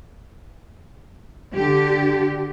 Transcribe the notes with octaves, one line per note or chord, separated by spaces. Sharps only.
D3 G4